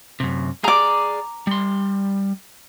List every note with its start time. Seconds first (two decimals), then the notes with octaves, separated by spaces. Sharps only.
0.20 F#2 C3
0.64 G#4 D5 A#5 D6
1.47 G3 C6